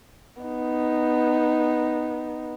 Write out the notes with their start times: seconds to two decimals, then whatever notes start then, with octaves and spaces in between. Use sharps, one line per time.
0.42 B3 D#4